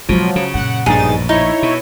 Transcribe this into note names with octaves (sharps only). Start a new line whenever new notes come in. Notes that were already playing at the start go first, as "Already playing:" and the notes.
C#2 B2 F3 F#3 G#3
C#3
F#2 A#2 F#5
A#1 G2 B2 D#4 G#4 A6
D#4 E4 C#5
B2